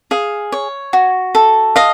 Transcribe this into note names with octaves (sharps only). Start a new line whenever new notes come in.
G#4 F5
C#5
F#4
A4
D#5 F5